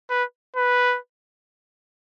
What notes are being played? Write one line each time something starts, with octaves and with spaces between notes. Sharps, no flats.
B4
B4